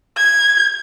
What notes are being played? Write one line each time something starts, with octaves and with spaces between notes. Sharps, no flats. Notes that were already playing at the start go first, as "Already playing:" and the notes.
G#6